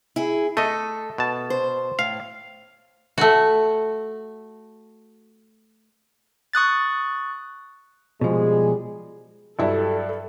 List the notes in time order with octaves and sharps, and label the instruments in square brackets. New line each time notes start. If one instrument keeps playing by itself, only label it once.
[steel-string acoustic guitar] E4 G#4
[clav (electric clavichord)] A3 D#5 [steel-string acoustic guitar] A4
[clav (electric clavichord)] B2 A5
[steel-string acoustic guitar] C5
[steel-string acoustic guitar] A2 [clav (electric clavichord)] F5
[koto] A3 F#4
[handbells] C#6 D#6 F#6 A6
[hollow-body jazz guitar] B2 F3 [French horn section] G3 G#3 G#4
[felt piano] G2 F#3 E4 [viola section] A4